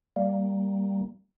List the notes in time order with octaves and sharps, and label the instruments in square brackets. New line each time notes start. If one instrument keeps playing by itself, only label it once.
[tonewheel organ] G3 A#3